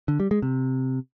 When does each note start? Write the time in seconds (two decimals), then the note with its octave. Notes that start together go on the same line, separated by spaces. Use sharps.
0.08 D3
0.20 G3
0.31 G#3
0.42 C3